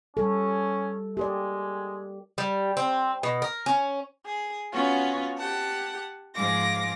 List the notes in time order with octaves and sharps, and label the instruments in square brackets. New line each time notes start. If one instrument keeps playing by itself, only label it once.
[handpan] G3 A4 [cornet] C#4
[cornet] G#3 [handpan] G4 A#4 D5
[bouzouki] G3
C4
B2
A#4
C#4
[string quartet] G#4
B3 C#4 F4 F#4
G4 F#5 A5
G#2 F3 G#3 F5 D6 A#6